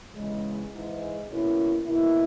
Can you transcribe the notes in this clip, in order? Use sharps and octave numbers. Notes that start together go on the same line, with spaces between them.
E2 C#3 G#3
G#2 E3 G#3
B2 A#3 C#4 E4
B2 A#3 E4